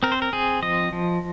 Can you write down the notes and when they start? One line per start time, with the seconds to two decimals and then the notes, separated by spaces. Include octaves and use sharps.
0.03 C4 A#4
0.12 C5
0.22 A#4
0.33 C4 G#4
0.62 F3 D#5
0.93 F3